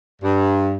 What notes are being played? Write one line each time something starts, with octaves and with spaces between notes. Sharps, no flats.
G2